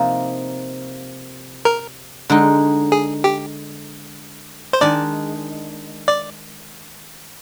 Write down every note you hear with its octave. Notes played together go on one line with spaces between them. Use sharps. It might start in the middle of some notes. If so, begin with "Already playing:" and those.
Already playing: C3 F3 A#3 D#4
A#4
D3 G#3 D#4
G#4
G4
C5
D#3 G#3 D4 D5
D5